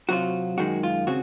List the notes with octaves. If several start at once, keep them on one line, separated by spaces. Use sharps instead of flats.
C3 F#3 C4 F4 F#4
F#2 D#3 G#3 F#4
F4
C#3 C4 F#4